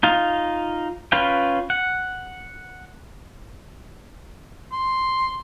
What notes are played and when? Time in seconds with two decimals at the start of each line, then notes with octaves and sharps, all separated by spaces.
0.03 D#4 F4 F5
1.12 C#4 F4 B4 F5 G5
1.70 F#5
4.72 C6